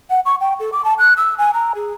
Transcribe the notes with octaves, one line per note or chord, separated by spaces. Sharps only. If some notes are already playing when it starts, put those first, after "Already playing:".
F#5
C#6
G5
A4
D6
A5
F#6
E6
G#5
A#5
G#4